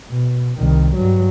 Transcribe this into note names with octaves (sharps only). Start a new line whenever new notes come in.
B2
C2 D#3
G2 F#3